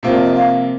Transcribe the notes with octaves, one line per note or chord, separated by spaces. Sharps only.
C3 F3 A#3 F4 C5
D5
D#5
F5